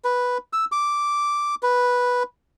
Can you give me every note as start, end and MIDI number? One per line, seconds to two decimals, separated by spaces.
0.05 0.38 71
0.53 0.65 88
0.72 1.55 86
1.63 2.23 71